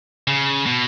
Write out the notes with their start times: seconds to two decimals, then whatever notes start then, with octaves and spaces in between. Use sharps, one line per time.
0.27 C#3
0.66 B2